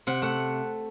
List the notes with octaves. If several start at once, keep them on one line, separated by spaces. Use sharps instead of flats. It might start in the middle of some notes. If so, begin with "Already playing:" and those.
C3 F#5
A3 F#5